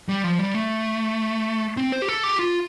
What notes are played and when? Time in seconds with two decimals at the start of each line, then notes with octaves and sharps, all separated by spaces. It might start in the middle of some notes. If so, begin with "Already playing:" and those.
0.09 G3
0.24 F3
0.39 G3
0.54 A3
1.77 C4
1.92 C5
2.02 G4
2.09 A4
2.23 G4
2.39 F4